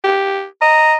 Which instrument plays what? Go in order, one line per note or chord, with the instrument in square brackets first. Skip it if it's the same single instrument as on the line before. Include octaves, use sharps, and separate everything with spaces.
[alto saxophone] G4
[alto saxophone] D#5 [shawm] A#5